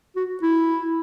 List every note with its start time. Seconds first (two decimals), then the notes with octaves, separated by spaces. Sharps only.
0.16 F#4
0.42 E4